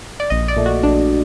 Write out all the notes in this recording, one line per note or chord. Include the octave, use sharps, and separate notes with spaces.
D5
A#1 D#5
D5
A#2 A3
F#4
A#1 D4